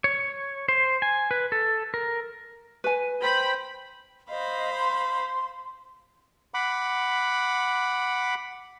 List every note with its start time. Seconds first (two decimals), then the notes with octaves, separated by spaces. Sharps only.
0.04 C#5
0.69 C5
1.02 G#5
1.31 B4
1.52 A4
1.94 A#4
2.84 B4 G#5
3.23 C5 G5 B5
4.30 C5 D#5 F5 B5
4.76 C6
6.54 F#5 B5 D6